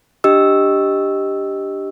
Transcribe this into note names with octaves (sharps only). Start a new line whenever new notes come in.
D4 G4 D#5 E6